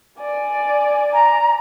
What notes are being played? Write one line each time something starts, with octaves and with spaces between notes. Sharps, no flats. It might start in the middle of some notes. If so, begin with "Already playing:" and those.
D5 G#5
A#5